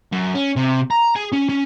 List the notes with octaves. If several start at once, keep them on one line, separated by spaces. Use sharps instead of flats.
F#2
C#4
C3
A#5
G#4
C#4
C#4